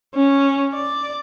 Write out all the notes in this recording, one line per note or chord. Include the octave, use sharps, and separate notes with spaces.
C#4
D5